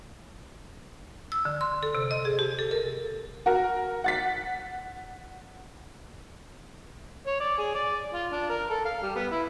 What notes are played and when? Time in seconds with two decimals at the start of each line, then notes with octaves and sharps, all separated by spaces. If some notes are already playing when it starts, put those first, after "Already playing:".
1.32 E6
1.45 D3
1.61 C6
1.83 A4
1.95 C3
2.11 D#5
2.25 G#4
2.39 G4
2.59 A4
2.71 A#4
3.46 F#4 A#4
4.04 F#5 A6 B6
7.26 C#5
7.40 D5
7.58 G#4
7.75 D5
8.14 F4
8.32 D4
8.50 A#4
8.70 A4
8.85 F5
9.02 G3
9.16 B3
9.32 E4